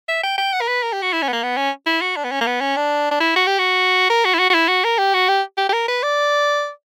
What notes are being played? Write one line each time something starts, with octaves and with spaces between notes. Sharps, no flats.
E5
G5
G5
F#5
A#4
B4
A#4
G4
F#4
E4
C#4
B3
A#3
B3
C#4
E4
F#4
D4
B3
C#4
A#3
B3
C#4
D4
D4
E4
F#4
G4
F#4
A#4
F#4
E4
F#4
F#4
E4
F#4
A#4
G4
F#4
G4
G4
G4
A#4
B4
D5